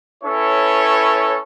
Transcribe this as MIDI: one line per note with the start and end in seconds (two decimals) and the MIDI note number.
0.24 1.40 61
0.24 1.40 64
0.24 1.40 69
0.24 1.40 71
0.24 1.40 73